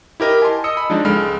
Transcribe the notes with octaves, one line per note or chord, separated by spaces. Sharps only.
E4 G4 A#4 D#5
G#5 A5 C6
D#5 D#6 E6 C#7
B5
F3 G#3 D4 D#4
C#2 G#3 A4 B5 F6